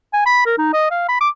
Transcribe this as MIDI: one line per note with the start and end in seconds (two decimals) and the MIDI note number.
0.13 0.21 80
0.26 0.44 83
0.46 0.58 70
0.58 0.69 63
0.73 0.89 75
0.91 1.05 77
1.09 1.20 83
1.21 1.29 86